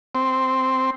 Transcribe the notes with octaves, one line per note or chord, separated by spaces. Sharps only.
C4